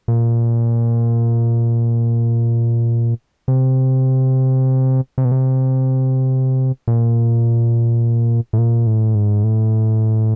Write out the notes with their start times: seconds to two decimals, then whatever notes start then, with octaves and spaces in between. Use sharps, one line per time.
0.08 A#2
3.48 C3
5.18 C3
5.25 B2
5.32 C3
6.88 A#2
8.53 A2
8.58 A#2
8.87 A2
9.15 G#2
9.43 A2